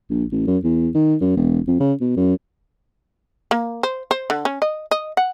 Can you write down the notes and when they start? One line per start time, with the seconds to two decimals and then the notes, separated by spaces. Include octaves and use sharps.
0.10 A#1
0.32 A1
0.47 F#2
0.64 E2
0.95 D#3
1.21 F#2
1.37 E1
1.68 F2
1.80 C#3
2.01 B2
2.17 F#2
3.51 A#3
3.83 C5
4.11 C5
4.30 D3
4.45 C#4
4.62 D#5
4.91 D#5
5.17 F#5